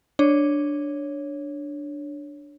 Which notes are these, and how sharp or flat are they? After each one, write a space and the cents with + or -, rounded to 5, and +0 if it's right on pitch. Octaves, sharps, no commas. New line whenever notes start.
D4 +0 C#5 +0